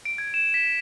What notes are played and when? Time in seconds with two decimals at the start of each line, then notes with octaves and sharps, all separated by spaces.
0.05 D7
0.18 G#6
0.34 E7
0.54 B6